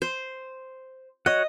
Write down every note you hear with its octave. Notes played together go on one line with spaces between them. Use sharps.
C5
F#4 C#5 D#5 F#5